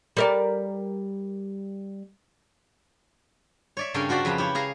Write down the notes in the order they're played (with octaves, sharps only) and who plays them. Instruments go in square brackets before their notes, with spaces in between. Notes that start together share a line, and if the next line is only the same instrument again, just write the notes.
[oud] G3 A#4 D5
[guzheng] C#5 D5 E5
G2 C#3 C#4 A4 A#4 G5
F4 F#4 C5 D5 E5
F2 C#3 B4
E4 G4 C#5
G#4 F5 A#5